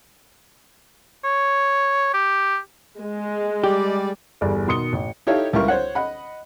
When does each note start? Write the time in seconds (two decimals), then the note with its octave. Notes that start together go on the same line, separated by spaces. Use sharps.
1.24 C#5
2.13 G4
2.99 G#3
3.64 G3 G4 D5
4.41 G1 E2 G3 G#4 D5
4.67 B2 D#3 C6 D#6 C#7 G7
4.93 A1
5.27 D#4 E4 G4 A4 C#5 F5
5.53 C#2 G3 E4 A#4 C#6
5.68 C5 C#5 F#5
5.95 D#5 F#5 B5